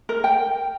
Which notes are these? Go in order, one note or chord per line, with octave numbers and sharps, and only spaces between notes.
A#4
G5